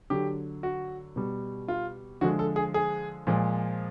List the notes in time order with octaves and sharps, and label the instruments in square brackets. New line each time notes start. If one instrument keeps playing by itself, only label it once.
[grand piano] D3 F#3 G4
F#4
B2 G3
F4
D3 F3 G#3 F#4
A4
G#4
G#4
A#2 F3 G#3